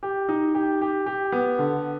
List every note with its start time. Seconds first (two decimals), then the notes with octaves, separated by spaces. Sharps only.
0.03 G4
0.29 D#4
0.55 G4
0.82 G4
1.06 G4
1.32 B3
1.59 D3